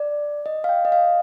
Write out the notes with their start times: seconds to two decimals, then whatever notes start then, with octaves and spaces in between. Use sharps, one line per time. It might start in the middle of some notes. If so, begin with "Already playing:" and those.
Already playing: D5
0.46 D#5
0.64 F5
0.69 G5
0.85 D#5
0.92 F5